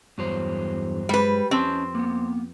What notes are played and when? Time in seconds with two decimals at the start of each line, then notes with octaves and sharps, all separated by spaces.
0.18 E2 G2 F#3 C5
1.09 G3 G#3 B4
1.51 F2 C4 C#4 D#5 A5
1.95 A#3 B3